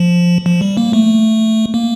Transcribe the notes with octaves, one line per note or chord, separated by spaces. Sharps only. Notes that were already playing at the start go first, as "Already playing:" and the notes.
Already playing: F3
F3
G3
A#3
A3
A#3